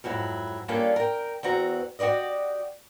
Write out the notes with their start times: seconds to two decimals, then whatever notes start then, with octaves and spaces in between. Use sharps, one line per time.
0.04 F2 G#2 F#3 E4
0.68 G3 A#3 C#4 D4 F4 A4
0.96 A#4 G5
1.43 E2 C4 F#4 A#5
1.99 F#4 G4 B4 D5 D#5